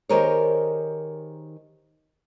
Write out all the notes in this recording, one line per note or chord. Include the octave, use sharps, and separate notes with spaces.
D#3 G4 G#4 A#4 C5 C#5